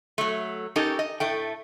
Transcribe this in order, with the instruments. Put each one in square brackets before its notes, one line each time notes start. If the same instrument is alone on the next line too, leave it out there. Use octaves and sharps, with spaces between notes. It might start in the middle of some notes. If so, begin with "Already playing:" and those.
[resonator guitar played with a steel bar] F#3 A3
C#4 D#4 G4 A4 A#4
D#5
A2 A3 G5